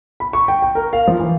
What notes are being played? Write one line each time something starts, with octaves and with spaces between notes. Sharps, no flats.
B5
C#6
G5
G5
A#4
F5
F3
E3